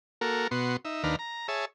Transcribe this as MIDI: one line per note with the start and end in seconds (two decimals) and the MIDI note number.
0.21 0.48 58
0.21 0.48 66
0.21 0.48 69
0.21 0.48 70
0.51 0.77 47
0.51 0.77 59
0.51 0.77 66
0.51 0.77 84
0.85 1.03 63
0.85 1.03 76
1.03 1.16 39
1.03 1.16 51
1.03 1.16 62
1.03 1.16 71
1.03 1.16 77
1.03 1.16 82
1.19 1.47 82
1.48 1.65 68
1.48 1.65 73
1.48 1.65 76
1.48 1.65 81